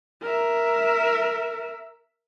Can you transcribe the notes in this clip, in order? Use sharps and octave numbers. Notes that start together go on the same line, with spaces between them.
A#4 E5